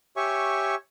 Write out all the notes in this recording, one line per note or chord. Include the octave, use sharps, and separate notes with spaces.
G4 C#5 E5 G#5 C#6